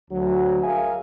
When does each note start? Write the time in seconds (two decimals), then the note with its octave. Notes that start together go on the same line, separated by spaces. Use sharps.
0.11 D2 F#3
0.64 G#4 A#4 E5 F5 G#5